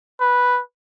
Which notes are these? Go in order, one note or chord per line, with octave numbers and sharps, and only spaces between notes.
B4